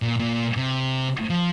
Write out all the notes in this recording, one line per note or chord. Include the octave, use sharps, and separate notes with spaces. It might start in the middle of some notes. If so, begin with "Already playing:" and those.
A#2
A#2
C3
F3